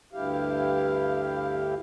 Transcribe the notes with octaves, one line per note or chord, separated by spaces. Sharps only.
D2 G2 E4 G4 F5